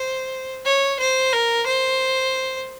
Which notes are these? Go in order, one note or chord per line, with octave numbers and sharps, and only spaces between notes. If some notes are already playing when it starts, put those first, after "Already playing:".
Already playing: C5
C#5
C5
A#4
C5